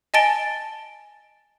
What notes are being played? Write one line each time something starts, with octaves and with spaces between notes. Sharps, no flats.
D#5 G#5 A5 A6 D7 G7